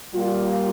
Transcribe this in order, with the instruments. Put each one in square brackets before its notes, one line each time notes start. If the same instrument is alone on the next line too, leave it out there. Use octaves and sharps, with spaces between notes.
[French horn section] A#2 G3 A#3 F4